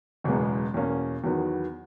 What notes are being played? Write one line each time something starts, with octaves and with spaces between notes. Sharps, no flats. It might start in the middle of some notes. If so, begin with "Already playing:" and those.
F#1 E2 B2 G#3 B3
E2 B2 A#3 C#4
E2 D#3 F#3 B3 F#4